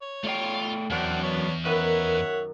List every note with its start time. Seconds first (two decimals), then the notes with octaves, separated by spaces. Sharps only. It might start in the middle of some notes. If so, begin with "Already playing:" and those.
0.02 C#5
0.24 A3 F4 D5 F5 G5
0.91 E2 F#3 C4 D4 A#4 F#5
1.23 B3 D4 C#5
1.65 F#2 D#3 B4 C#5 E5 F#5